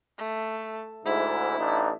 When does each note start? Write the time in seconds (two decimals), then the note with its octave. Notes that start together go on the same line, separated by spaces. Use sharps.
0.18 A3
1.05 D2 G#2 E4
1.58 A1 D4 D#4